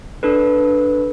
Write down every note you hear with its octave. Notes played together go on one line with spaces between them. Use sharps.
D4 A4 B4